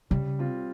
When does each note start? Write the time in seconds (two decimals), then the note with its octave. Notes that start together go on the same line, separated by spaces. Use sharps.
0.10 C#3 G3
0.39 C4 F4